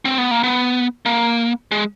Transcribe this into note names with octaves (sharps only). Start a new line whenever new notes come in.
C4
B3
A#3
B3
A#3
G#3